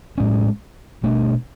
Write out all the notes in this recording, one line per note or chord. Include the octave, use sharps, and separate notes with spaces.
A2 G#3 C#4
B2 A3 D4